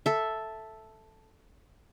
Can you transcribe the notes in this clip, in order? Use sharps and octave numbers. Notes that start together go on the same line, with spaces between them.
A4 E5